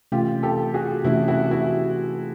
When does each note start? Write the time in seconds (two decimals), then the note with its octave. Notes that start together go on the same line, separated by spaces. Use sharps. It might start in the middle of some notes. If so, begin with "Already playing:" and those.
0.12 C3 E3 A3 C#4 F4 G4
0.43 G4 A4
0.74 F#4 G#4
1.04 C3 E3 A3 C#4 E4 F#4
1.28 E4 F#4
1.51 E4 F#4